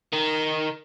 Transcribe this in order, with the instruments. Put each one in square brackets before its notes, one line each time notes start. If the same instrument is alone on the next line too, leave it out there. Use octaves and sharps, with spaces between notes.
[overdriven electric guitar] D#3